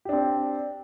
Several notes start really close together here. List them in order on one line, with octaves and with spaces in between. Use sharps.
G4 D4 C4